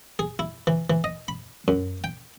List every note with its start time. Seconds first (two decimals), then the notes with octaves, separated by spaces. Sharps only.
0.19 G#4
0.39 E4
0.67 E3
0.90 E3
1.04 D#5
1.28 B5
1.68 F#2
2.04 G5